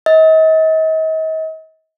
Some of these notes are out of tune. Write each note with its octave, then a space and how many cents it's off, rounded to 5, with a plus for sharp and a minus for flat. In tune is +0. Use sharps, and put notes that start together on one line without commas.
D#5 +40